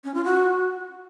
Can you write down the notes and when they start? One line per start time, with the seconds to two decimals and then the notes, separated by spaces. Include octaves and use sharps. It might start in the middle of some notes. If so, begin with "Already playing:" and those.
0.04 C#4
0.14 F4
0.24 F#4